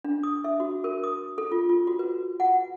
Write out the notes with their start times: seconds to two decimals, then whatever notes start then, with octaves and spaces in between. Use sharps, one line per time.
0.04 D4
0.23 D#6
0.44 E5
0.60 F#4
0.84 A#4
1.04 D#6
1.38 A4
1.52 F4
1.69 F4
1.87 F#4
1.99 B4
2.40 F#5